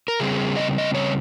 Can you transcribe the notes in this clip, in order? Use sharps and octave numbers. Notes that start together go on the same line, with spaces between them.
A#4
C#3 G3 C4 G#4
D#5
D#5
C#5